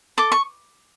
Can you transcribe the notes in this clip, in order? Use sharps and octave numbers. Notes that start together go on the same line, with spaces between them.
A4 D6
C#6